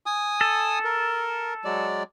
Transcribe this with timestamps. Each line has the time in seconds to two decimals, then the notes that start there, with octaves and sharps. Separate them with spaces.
0.06 G#5 D#6
0.41 A4
0.84 A#4
1.65 F#3 G#3 D5